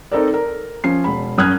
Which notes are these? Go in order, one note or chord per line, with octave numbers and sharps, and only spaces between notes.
C4 D#4 A4 A#4 D5
A#4
F3 C#4 C7
E1 B5
F#2 C#4 D#6 F6 F#6 G#6